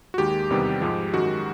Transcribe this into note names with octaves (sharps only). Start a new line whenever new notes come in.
F#4
D#2 D#3 G#3 G4
E2 C3 D#3 G3 B3
G#2 F3 G#3
F#2 D#3 G#3 F#4